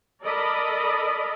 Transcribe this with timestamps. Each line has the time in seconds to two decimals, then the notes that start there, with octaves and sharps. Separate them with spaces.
0.24 A4 A#4 D5 D#5 B5